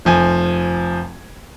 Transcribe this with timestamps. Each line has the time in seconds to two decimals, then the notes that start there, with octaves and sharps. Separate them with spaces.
0.05 F1 F3 G#5 G#6